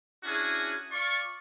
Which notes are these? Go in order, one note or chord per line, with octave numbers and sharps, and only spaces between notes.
C#4 D4 E4 F#4 G#4
F4 D5 C#6